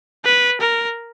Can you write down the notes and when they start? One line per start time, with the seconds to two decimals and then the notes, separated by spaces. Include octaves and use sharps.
0.25 B4
0.61 A#4